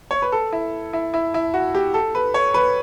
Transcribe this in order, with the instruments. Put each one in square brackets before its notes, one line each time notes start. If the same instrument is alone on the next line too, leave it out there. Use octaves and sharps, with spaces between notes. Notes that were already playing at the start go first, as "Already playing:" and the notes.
[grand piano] C#5
B4
A4
E4
E4
E4
E4
F#4
G4
A4
B4
C#5
B4